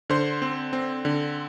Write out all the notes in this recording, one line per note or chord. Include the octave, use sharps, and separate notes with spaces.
D3 C5 C6
C4
C4
D3